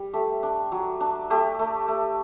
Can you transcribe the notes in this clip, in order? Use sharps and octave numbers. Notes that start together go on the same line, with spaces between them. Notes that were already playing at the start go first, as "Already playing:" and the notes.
Already playing: G3
A3 G4
D4
F#3
D4
A3 G4
A3
A3